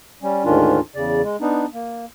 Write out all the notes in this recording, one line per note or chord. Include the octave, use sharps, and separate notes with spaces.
G3 C#4
D2 G#2 D#3 C#4 D4 F4
E2 C#3 D5
G#3
B3 D4 D#4
A#3